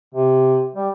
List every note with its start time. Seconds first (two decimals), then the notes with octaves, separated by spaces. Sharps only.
0.14 C3
0.75 G3